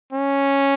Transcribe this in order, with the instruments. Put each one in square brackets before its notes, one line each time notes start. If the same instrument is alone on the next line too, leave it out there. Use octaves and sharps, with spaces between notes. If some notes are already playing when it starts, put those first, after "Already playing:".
[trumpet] C#4